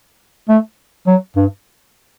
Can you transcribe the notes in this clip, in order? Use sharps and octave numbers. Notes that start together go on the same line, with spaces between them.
A3
F#3
G2